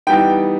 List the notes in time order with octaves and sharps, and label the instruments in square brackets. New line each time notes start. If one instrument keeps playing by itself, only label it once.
[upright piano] E3 G3 B3 D#4 G5